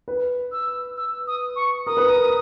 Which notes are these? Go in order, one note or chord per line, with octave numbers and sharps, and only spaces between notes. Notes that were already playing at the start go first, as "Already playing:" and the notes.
B4
E6
E6
D#6
C#6
A#4 D#6
B4
A#4